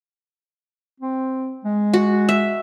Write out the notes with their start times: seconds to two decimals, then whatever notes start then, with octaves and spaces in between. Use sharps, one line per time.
1.00 C4
1.65 G#3
1.93 F#4
2.29 E5